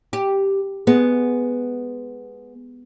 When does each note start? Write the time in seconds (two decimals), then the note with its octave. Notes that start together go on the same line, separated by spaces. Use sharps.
0.13 G4
0.87 G#3 B3